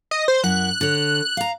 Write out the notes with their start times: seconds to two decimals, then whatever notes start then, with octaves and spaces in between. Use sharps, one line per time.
0.11 D#5
0.28 C5
0.44 F#2 E4 F#5 F#6
0.81 D3 C#5
1.37 F5 A#5